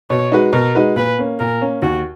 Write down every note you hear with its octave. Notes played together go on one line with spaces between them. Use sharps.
B2 C#5
G#3 D#4 F#4 B4
B2 A#4
G#3 D#4 F#4 B4
A#2 B4
A#3 C#4
A#2 A#4
A#3 C#4
D#2 F#4